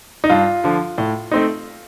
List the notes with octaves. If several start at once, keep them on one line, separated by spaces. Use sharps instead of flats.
D#4
G2 F4
D3 F3
A2
A3 C4 D#4